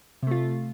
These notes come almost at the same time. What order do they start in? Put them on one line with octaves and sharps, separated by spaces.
C3 A3 F4